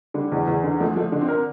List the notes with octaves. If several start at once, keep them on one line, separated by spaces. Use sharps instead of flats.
D3 G3
E2
E2
D3
F3 A3
F3 A3
D3
C4
A#4